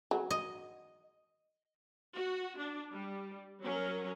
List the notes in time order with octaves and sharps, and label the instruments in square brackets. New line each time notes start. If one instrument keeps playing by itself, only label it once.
[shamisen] F#3
[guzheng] D#5
[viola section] F#4
D4
G3
F#3 C#4 A#4